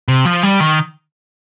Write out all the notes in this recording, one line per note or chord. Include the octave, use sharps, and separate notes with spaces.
C3
F3
G3
D#3